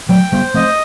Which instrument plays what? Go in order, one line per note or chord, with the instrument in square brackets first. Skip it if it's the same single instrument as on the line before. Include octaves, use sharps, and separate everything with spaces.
[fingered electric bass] F#3 A3 [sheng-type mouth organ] G5
[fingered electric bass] G3 B3 [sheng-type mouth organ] C5
[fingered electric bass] A3 C4 [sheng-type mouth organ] D#5